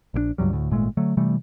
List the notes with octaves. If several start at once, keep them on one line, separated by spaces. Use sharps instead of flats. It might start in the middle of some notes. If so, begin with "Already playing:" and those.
A#1 C#3 D4
C#2 G2 F#3 G3
D2 A2
G#1 A#2 G#3 A3
D3 F#3 A3
C3 E3 G3 A3